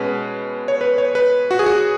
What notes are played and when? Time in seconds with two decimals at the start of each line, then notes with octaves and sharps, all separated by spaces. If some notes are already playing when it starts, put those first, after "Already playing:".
Already playing: B2 G#3 C#4 B4
0.68 C#5
0.81 B4
0.98 C#5
1.15 B4
1.51 F#4
1.59 G#4
1.66 F#4